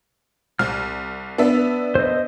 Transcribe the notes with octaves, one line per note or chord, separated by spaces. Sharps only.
C2 F6
B3 D4 E5
C5 D#5